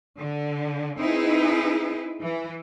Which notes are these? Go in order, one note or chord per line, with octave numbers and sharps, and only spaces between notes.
D3
C4 D#4 E4 G#4 B4
E3